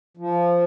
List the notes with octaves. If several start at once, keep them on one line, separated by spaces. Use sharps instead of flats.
F3